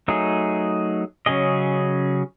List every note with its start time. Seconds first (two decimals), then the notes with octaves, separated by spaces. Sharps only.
0.08 F#3 A3 D#4 G#4
1.26 C#3 F#3 C#4 G#4 D#5